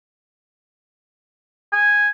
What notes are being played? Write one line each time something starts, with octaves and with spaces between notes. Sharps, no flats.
G#5